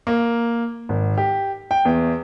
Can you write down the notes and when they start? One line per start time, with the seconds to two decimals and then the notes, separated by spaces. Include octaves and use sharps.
0.07 A#3
0.89 G#1
1.18 G4
1.71 G5
1.85 E2